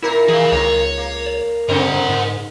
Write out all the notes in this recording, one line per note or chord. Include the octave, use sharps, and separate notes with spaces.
A#2 E4 A#4
E3 G#4 F5
C#2 D#3 A#3 A#4 C#5
A#3
G2 C#3 C4 D#4 A#4 F#5
G#2